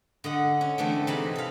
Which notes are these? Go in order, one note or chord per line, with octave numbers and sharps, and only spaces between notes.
D3 D#5 F#5
C#4
D3 E3 A3 C4 D4
C3 G#3 D#4 A5 B5
A4 F5